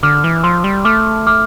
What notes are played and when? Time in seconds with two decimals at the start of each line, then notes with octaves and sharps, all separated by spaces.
0.03 D3 D6 F6
0.24 E3
0.43 F3 C6 E6
0.64 G3
0.85 A3 D6 F6
1.27 D6 F6